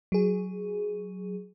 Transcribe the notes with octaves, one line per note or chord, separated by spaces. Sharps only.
F#3 G#4